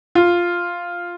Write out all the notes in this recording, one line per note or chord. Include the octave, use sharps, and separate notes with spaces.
F4